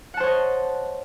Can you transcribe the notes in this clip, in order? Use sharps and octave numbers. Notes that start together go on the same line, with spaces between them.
C5 C#5 D#5 F#5 A5